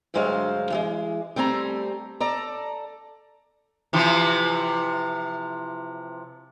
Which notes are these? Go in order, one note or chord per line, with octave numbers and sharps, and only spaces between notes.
D2 G2 F#3 G#3 C5 F5
E3 F#3 G#3
G3 A3 C4 G#5 A#5
A4 D5 A#5
C3 E3 F3